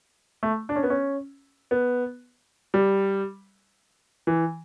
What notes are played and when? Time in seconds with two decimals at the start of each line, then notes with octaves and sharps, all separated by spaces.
0.43 A3
0.69 D4
0.76 C#4
0.83 B3
0.90 C#4
1.71 B3
2.74 G3
4.27 E3